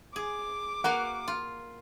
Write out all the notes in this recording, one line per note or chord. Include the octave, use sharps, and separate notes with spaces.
G#4 D6
A#3 F#4 F5 F#5
F4